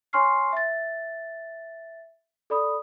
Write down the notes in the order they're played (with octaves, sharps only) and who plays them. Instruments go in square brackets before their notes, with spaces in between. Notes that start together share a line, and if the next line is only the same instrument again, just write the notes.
[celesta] C#5 G#5 C6 C#6 F6 C7
E5 A6
A4 D5 B5 D#6